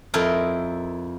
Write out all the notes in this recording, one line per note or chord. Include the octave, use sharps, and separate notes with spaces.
F2 E4 A#4 D#5